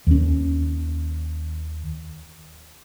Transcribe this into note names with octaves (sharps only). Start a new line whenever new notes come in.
D#2 C#4